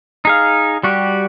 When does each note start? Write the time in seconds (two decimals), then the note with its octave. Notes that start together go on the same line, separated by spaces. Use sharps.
0.25 D#4 G#4 F5
0.83 G3 F#4 G4